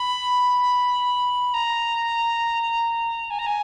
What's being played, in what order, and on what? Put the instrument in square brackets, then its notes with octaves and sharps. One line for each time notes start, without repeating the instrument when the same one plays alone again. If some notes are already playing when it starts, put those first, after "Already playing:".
Already playing: [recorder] B5
A#5
G#5
A#5
G#5